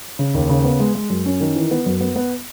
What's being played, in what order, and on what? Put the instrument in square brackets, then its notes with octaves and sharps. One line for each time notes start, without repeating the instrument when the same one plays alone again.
[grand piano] C#3
D#2
C#3
B3
G#3
G#3
F#2
C#4
D#3
E3
B3
F#2
B3
B3